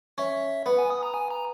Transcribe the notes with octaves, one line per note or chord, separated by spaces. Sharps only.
C#4 E5
B3 F#5
G#5
D#6
A#5
G#5
A#5